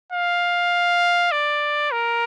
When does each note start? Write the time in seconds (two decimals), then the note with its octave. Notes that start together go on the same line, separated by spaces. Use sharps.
0.13 F5
1.32 D5
1.92 A#4